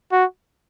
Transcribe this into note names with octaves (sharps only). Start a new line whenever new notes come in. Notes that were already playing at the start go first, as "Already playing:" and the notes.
F#4